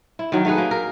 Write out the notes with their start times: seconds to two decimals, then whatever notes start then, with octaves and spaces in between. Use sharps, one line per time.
0.19 E4
0.32 D#3 F#3
0.45 A3 D#4 G#4 B4
0.58 A#3
0.71 A#4